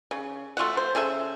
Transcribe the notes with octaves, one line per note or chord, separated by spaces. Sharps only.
C#3
A3 F4 F#4 F#5
C5
C#3 G#4 A4 E5